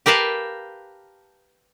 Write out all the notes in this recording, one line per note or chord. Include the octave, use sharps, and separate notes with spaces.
G4 A#4 B4 F5 A5